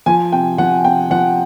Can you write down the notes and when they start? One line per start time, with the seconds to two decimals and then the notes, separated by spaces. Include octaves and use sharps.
0.06 F3 G#5
0.33 C3 G5
0.58 F3 F#5
0.85 C3 G5
1.10 F3 F#5